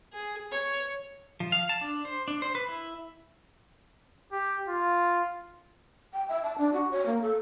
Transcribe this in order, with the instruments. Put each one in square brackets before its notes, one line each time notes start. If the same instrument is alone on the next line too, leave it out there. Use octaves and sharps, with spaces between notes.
[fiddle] G#4
C#5
[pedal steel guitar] F3
F5
A5
D4
C5
D4
C5
B4
E4
[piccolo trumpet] G4
F4
[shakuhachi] G5
E5
A5
D4
F#4
C#5
A#3
A4